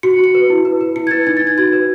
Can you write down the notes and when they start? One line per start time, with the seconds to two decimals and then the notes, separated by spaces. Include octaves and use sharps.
0.03 F#4 C#7
0.19 F#4 C#7
0.35 B4
0.50 E4
0.65 B4
0.81 B4
0.96 E4 C#7
1.07 G#6
1.11 B4 A6
1.27 D#4 G#6
1.37 A6
1.42 D#4 G#6
1.58 F#4 G#6
1.73 B4